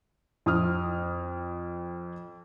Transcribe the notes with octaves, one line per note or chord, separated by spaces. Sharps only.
F2 D#6 F6